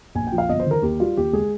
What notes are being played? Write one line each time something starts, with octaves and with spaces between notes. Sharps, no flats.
A#1 G#5
G5
F3
F5
G1 D#5
C5
D#3
A#4
D#2 G4
G3 F4
D#2 G4
G#3 G#4